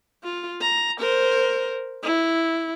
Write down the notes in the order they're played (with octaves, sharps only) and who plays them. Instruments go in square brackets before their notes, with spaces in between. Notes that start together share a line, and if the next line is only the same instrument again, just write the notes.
[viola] F4
A#5
A#4 C5
E4